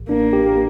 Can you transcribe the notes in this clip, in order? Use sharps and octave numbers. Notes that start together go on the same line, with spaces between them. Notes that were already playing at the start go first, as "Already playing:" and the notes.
Already playing: A1
A#3 D4
G4